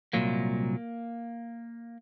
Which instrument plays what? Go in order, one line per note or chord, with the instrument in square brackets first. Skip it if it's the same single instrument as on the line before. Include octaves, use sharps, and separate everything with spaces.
[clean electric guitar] C2 A#2 F#3 A#3